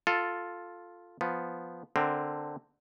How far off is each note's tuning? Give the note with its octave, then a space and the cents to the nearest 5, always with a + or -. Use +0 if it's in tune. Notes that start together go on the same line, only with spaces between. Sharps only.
F4 +5 A4 +0
F3 +0 B3 +0
D3 +10 C4 +0 A#4 +0